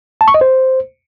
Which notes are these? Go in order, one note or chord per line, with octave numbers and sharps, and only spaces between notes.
A5
C#6
D#5
C5